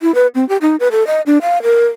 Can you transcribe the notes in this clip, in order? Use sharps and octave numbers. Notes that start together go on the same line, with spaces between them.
E4
B4
C4
G4
D#4
B4
A4
D#5
D4
F5
A#4